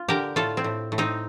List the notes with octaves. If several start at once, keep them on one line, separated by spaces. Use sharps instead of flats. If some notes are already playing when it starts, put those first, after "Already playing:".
Already playing: F4
D3 G4 A#4
A2 F4 A4
C4
A2
A2
C4 D#4